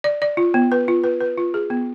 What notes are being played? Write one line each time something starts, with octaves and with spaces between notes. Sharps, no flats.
D5
D5
F4
B3
B4
F4
B4
B4
F4
G#4
B3